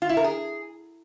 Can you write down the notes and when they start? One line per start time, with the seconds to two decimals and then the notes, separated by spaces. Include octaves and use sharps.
0.02 F4
0.09 E4
0.17 A#4
0.24 G#4